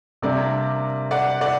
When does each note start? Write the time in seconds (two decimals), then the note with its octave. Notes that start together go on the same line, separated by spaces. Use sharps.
0.22 C3 G3 A#3 D4 A#4 D5
1.11 D5 F#5
1.41 D5 F#5